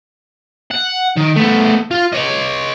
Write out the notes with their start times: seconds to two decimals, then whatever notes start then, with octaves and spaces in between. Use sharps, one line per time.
0.71 F#5
1.16 D#3
1.36 A3 B3
1.91 F4
2.13 C#5 D#5